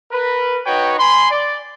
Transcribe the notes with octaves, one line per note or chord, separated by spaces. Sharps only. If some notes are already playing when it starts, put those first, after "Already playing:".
A#4 B4
D#4 F#4 B4 C#5 G5
G#5 B5 C6
D5